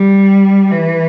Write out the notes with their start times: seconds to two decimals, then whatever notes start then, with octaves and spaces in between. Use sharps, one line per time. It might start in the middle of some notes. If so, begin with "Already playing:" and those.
Already playing: G3
0.71 E3